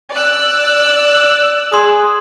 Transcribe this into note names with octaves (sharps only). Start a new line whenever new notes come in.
D5 E6 F#6
G#4 C6 D#6